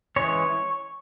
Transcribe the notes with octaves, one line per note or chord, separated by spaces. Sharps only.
E3 G#3 C#4 C#5